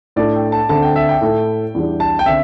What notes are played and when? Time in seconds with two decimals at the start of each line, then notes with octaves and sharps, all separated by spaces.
0.16 A2 A3 D4 A4 D5
0.34 G5
0.52 A5
0.69 D2 D3 C4 A4 A5
0.83 G5
0.96 E5
1.09 G5
1.21 A2 A3 E4 A4
1.75 E2 E3 G3 D4
2.00 A5
2.19 G5
2.26 D3 C4 E5